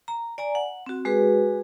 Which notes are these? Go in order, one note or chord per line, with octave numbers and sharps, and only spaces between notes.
A#5
D5 G#5 A#5
F#5
C4 F#4
G#3 F#4 G#4 B4